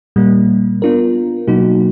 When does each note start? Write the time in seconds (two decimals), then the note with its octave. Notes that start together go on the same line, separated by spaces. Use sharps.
0.16 A#2 G3 A#3
0.82 B3 D4 F4 A#4
1.48 B2 F#3 A#3 D#4 F#4